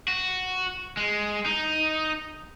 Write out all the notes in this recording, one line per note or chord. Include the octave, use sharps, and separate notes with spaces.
F#4
G#3
D#4